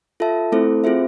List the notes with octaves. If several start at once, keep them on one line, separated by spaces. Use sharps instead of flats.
F4 A4 E5 A5
A3 C4 E4 A4 C5
C4 F4 G#4 C5 E5